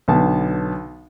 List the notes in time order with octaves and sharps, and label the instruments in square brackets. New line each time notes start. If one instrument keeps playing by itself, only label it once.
[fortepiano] B1 D3 B3 A5